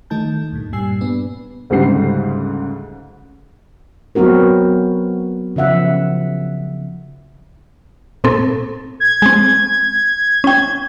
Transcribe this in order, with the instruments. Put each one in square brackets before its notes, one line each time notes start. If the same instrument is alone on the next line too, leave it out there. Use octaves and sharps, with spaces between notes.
[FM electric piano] D#3 A3 D#4 A5 G6
D2 G2 A#2
G2 A#2 G3 G#5 E6 C7
B3 D4
[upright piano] D2 G#2 C#3 G3 F#5 C7
[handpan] F#3 B3 C4 F#4 A#4
C#3 F3 E5 F#5
[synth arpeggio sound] A#2 C4 A4
[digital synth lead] G#6
[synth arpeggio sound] G#3 C4
C#4 G5